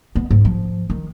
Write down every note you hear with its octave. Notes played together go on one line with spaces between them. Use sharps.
B3
G#2
F3
D#3